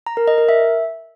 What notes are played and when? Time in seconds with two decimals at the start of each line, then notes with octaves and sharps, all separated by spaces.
0.07 A#5
0.17 A#4
0.28 D#5
0.38 A#4
0.49 E5